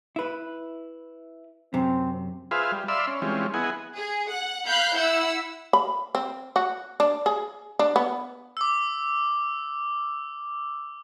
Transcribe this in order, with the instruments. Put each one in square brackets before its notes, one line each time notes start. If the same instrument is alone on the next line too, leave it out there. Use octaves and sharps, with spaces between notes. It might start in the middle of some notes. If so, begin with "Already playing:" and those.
[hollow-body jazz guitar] E4 B4
[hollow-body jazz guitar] F#2 C3 [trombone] C4
[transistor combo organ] F4 G#4 B4 C5 E5 F5
G3
D5 E5 F5 B5 C6 E6
C#4
E3 G3 G#3 C4 C#4 F4
B3 E4 G#4 D#5 F#5 G#5
[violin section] G#4
F#5
F5 B5 F#6 G6
E4 F#5 E6
[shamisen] B5
C4
F#4
D4
G#4
D4
B3
[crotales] D6 E6